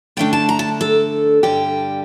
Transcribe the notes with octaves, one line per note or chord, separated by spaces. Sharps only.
D3 A3 D4 G5
A5
A#5
A5
A4
G2 D3 G3 G4